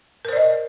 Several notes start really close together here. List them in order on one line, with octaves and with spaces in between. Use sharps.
A#4 C5 D5 D#5